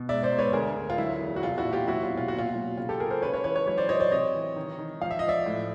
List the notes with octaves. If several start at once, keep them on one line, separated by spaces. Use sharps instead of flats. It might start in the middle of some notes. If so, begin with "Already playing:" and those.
Already playing: B2
G#2 D5 E5
C5 D5
G#2
B4 C#5
D2 G#4 A#4
D2
F4
F#3 E4
E2
F#4
C2 F4
E4 F#4
A#2
F4 G4
F#3 E4 F#4
F4
B2
F4
A#2 F#4
F4
F#3
C#3 F4
G4 A4
C#3 G#4 A#4
A#4 C5
C#3 B4 C#5
B4 C#5
E3 B4 C#5
B4 C#5
F#3 B4 C#5
C5 D5
F#3 C#5 D#5
C5 D5
C3 C#5 D#5
E3
D#3
D#3
F3 F5
E5
D#5
F3
D5 E5
A2